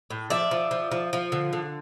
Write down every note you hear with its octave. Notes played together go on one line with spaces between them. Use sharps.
A2
F3 D5 E5
F3
F3
F3
F3
D3
D3